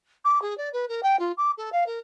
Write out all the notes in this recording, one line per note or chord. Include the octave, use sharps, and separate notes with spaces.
D6
G#4
D5
B4
A#4
G5
F4
D6
A4
F5
A#4